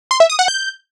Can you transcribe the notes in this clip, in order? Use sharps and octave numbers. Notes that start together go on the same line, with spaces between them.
C6
E5
D#6
F#5
G6